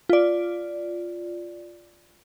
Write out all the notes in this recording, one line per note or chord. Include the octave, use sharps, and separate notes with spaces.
F4 D5